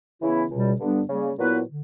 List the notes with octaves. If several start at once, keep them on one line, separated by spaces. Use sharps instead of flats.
C#3 E3 B3 E4
C#2 B2 G3
G2 D3 G3 B3 D4
C#3 G3 A#3
A#2 F#3 B3 E4 B4
D3